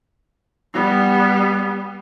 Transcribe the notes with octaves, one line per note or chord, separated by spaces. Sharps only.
G3 B3